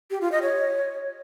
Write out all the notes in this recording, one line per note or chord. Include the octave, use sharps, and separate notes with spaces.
G4
F4
D#5
C#5